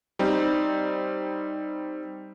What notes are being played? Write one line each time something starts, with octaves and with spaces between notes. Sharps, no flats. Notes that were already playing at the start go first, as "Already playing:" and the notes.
G3 C4 D#4